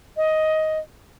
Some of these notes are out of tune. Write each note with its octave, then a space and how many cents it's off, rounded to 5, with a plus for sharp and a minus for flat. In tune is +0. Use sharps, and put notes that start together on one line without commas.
D#5 +10